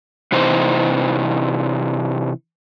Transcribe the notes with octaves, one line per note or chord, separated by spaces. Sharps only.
C3 E3 D#4 C5